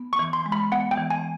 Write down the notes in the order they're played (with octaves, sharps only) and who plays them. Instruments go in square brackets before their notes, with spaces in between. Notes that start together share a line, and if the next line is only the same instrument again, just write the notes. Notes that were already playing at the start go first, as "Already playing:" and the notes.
Already playing: [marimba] B3
[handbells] C#6
[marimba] E3
[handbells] C6
[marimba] G#3
[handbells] B5
[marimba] B3 [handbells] F#5
[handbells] G5
[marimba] E3
[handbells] G#5